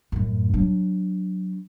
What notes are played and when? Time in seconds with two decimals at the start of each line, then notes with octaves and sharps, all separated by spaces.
0.12 F#2 A2
0.54 F#3 D4